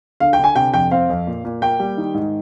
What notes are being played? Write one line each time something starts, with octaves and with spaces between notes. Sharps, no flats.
D3 F5
G5
D3 G#5
C3 G5
F2 G5
C4 F5
F2
A#2
A#2
A#3 G5
G3
D#3
G#2